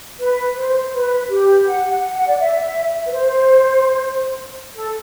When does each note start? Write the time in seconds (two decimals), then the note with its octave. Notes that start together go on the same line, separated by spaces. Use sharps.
0.19 B4
0.56 C5
0.93 B4
1.29 G4
1.65 F#5
1.89 F#5
2.14 F#5
2.27 D5
2.39 E5
3.06 B4
3.11 C5
4.75 A4